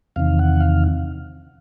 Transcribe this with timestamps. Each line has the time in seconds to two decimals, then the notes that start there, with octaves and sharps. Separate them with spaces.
0.16 E2 C3 D#3 F5
0.39 F#5
0.60 F5